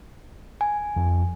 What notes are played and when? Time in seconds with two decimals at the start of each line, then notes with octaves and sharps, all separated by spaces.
0.61 G#5
0.96 F2